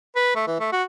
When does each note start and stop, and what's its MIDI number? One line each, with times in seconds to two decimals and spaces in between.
0.16 0.33 71
0.35 0.45 57
0.47 0.56 52
0.60 0.70 57
0.72 0.83 66